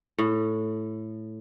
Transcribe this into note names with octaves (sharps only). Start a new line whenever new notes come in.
A2